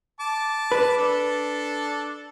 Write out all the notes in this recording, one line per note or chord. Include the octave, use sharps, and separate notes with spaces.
A5 D6
B4
D4 A4